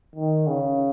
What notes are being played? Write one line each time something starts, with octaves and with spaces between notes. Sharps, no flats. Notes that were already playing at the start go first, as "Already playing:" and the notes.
D#3
C#3